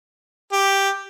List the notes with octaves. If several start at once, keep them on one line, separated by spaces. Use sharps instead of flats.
G4